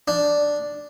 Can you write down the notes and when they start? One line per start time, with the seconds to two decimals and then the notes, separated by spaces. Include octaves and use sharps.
0.08 D4